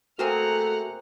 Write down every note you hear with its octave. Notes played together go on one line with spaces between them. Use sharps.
A3 A#3 C4 F#4 G#4 F#5 A#5 F6